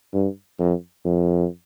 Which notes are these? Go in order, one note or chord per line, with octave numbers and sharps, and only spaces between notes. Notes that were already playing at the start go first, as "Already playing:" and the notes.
G2
F2
F2